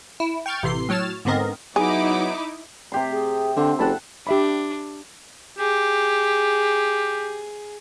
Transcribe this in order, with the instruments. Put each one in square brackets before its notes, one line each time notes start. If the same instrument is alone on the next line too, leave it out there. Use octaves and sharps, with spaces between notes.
[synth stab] E4
G5 C#6 F6 G6 A6
A1 C3 E3 C6 C7
A2 F#3 C#5 F6 A6 E7
G#2 D3 B3 C4 A#4 D#5
[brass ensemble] F#3 B3 [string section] D#4 E4 D6 [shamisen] G#4
[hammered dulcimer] C3 G4 C6
[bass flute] G#4
[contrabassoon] D3 [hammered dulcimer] C4 [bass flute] F#5
[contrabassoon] F#1 [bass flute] A4 [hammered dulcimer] F#5 A5 B5
[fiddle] D4 [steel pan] G4 E5 B5
[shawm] G4 [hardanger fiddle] G#4